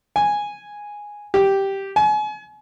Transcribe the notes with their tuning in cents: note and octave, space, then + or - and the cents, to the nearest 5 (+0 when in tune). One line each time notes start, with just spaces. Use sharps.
G#5 -5
G4 -5
G#5 +35